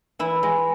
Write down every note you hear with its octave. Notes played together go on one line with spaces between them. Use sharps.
E3 E4
G#3